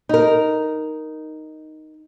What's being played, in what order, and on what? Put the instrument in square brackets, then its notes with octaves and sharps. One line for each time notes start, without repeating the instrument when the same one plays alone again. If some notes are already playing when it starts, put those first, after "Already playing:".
[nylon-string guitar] D#4 A#4